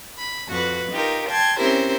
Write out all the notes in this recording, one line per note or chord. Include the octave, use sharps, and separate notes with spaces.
B5
F2 F#4 B4
D#4 F4 G4 A#4
G5 A5 C6 G#6
C4 C#4 E4 G4 A#4 C5